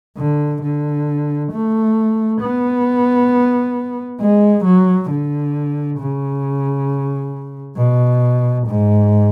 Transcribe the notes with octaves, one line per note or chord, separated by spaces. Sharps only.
D3
D3
A3
B3
G#3
F#3
D3
C#3
B2
G#2